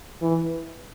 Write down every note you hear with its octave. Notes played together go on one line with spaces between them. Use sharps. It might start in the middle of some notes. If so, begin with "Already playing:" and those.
E3